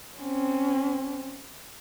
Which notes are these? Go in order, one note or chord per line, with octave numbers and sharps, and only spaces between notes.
C4 C#4